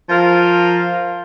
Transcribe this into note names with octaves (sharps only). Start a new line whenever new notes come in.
F3 A#4 F5